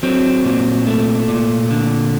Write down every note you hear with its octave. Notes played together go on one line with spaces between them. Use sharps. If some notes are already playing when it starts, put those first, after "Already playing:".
F#3 C4
A#2
A3
A#2
D3